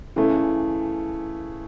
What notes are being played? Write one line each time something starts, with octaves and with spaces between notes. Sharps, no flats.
C#3 E3 A3